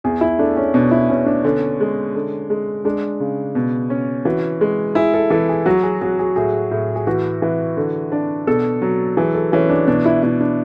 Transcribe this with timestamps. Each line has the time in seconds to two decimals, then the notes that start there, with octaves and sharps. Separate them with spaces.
0.04 E2 G#4
0.21 E4
0.39 A3 D4
0.57 C#4
0.74 B2 D4
0.91 E4
1.09 B2 C#4
1.26 D4
1.44 D3 C#4
1.80 G#3
2.15 D3
2.50 G#3
2.85 G#3 D4
3.20 C#3
3.55 B2
3.90 C#4
4.25 E3 F#4
4.61 G#3
4.95 E4 G#4
5.14 A4
5.30 E3 A4
5.49 G#4
5.66 F#3 F#4
5.83 G#4
6.01 F#3 G#4
6.19 G#4
6.36 A2 G#4
6.71 A2
6.96 G#4
7.07 E3 F#4
7.42 E3
7.77 D3
8.12 D4
8.47 B2 A4
8.82 F#3
9.17 E3 G#4
9.34 A4
9.52 E3 C#4
9.69 D4
9.87 B2 D4
10.06 E4
10.23 B2 E4
10.41 D4